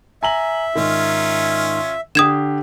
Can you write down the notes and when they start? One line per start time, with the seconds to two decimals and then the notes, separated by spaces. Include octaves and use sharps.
0.23 E5 G#5 A#5 F#7
0.75 G#2 D#3 C#4 F4
2.15 D3 G4 D#6 G#6 E7